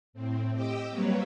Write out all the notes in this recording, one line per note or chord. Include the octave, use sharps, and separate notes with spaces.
A2 C4
G4 D#5 G5 D6 E6
F#3 G3 A#3 C4 B4 C#5